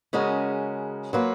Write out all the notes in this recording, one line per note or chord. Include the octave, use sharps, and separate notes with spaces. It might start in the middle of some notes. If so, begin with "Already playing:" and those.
C#3 G#3 C#4 F#4 A#4
F#3 A#3 F4 B4